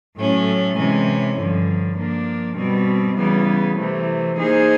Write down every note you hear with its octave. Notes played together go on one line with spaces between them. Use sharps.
A2 F#3 A3 C#4
C3 E3 G#3 C#4
G2 D3 F3
F3 A#3 D4
B2 G3 C4
C#3 E3 G3 B3
C3 E3 A3
A#3 D#4 G#4 C5